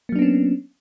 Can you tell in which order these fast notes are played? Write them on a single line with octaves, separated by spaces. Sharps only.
A#3 F#3 D4 B3 C#4